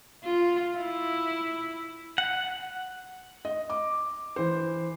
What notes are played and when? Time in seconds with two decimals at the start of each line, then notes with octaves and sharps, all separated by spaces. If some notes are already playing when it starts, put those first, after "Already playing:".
0.25 F4
0.79 E4
2.18 F#5
3.45 D#5
3.70 D6
4.36 E3 C5